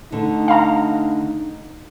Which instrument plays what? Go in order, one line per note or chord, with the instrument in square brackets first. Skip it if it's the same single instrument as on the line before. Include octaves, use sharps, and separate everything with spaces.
[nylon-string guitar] D3 A3 [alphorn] D#4
[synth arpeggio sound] F5 A#5